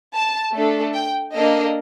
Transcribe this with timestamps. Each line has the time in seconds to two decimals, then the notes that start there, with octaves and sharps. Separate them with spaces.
0.15 A5
0.54 A3 D4 A4
0.94 G5
1.33 A#3 D4 A4 D#5